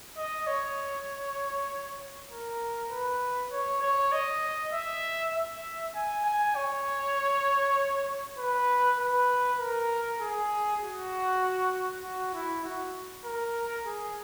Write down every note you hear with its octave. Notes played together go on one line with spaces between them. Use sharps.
D#5
C#5
A#4
B4
C#5
C#5
D#5
E5
E5
G#5
G#5
C#5
B4
B4
A#4
G#4
F#4
F#4
E4
F#4
A#4
G#4